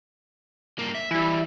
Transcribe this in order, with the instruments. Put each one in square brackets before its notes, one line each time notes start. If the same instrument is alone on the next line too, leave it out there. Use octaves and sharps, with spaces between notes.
[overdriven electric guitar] G2 A#3
E5
[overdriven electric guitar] E3 G3 [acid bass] E4